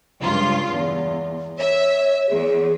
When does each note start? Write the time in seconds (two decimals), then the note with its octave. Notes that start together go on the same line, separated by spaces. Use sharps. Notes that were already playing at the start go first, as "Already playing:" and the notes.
0.20 C#2 G2 F4
0.73 E2
1.58 C#5 E5
2.30 E2 G#4